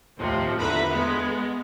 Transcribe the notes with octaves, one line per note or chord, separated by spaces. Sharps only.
D#2 A2 C3 F3
E2 D3 B4 E5 A#5 B5
G#3 B3